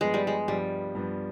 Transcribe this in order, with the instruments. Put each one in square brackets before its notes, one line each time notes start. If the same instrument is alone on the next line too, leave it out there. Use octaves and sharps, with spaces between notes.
[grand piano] G2 F3 B3 [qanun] G#3
[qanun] G3
G#3
[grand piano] G2 F3 B3 [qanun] G3
[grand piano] G2 F3 B3